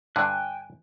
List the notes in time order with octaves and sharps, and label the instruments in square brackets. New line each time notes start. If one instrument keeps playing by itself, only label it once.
[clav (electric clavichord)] G2 D3 [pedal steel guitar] G5 G#5 F#6